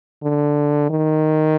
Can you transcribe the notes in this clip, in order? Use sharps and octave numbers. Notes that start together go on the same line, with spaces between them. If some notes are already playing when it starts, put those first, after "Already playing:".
D3
D#3